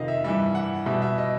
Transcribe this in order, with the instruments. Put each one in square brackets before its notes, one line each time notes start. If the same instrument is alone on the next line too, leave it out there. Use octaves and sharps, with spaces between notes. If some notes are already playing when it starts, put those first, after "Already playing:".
Already playing: [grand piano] F2 C3 D#3 D#5 F5
E5
G2 E3 G3 E5
F#5
B2 G3 E5
E5
D#5